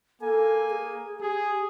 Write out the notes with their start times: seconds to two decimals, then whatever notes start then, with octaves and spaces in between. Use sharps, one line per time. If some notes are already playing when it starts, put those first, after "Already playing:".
0.22 A#3 A4 G#5
0.70 G#4
1.21 G4 G#4